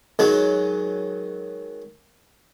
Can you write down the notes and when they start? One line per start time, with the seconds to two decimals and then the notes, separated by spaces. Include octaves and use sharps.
0.19 D#3 F#3 G#3